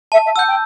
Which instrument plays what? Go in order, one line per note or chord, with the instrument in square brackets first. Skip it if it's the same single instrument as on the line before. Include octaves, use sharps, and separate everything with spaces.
[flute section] E5 [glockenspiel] A5
[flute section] E5
[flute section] F#5 [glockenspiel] E6
[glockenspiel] G6
[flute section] G5